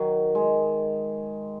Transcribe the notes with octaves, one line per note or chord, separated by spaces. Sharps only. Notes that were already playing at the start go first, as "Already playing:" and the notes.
Already playing: D#3 F#3
G#3